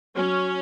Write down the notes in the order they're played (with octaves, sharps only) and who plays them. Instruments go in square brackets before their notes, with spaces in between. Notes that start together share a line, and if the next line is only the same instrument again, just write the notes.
[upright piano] F#3 [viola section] C#4